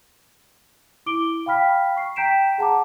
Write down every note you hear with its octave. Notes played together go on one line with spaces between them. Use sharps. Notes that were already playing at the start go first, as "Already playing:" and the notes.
E4 D6 D7 G7
F5 G5 B5 F6 B6
C#6 C7
G5 A#5 G6 B6 D7 E7
G#4 F#5 A5 A#5 D6